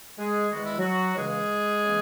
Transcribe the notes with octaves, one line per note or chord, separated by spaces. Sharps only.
G#3 G#4
E2 D#3 G#3 B3 F#4
E4
F#3 F#4
C#2 C#3 E3 G#3 A#3 G#4
C#3 E3 A#3